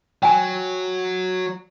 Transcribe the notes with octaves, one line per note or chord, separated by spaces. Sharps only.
F#3 G5 G#5